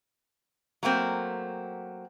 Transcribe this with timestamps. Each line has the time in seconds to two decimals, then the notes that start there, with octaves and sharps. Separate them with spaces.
0.83 F#3 A3 A#3 C4